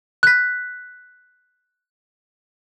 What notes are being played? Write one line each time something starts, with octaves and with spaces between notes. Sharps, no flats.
F#6 B6